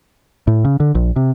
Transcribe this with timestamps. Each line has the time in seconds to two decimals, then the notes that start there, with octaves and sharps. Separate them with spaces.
0.47 A2
0.65 C#3
0.80 D3
0.95 A#1
1.16 C3